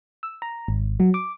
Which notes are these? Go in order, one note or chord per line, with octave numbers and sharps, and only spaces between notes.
E6
A#5
G#1
F#3
D6